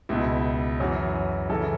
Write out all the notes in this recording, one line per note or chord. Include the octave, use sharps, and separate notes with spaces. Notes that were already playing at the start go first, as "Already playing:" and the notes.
C#2 B2 E4
F#2 E3 C#4 F#4
F#2 C#3 E3 E4 A4